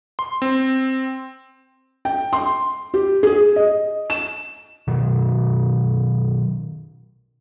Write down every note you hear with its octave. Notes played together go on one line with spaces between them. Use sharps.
C6
C4
G5
C6
G4
G#4
D#5
E7
B2 D#3 F#3